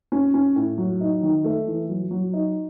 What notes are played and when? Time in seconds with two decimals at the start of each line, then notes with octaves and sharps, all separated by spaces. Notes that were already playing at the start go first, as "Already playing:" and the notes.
0.12 C#4
0.34 C#4
0.56 A2
0.78 F#3
1.01 D#4
1.23 D#3
1.45 A3
1.67 E3
1.89 F#3
2.11 F#3
2.33 D#4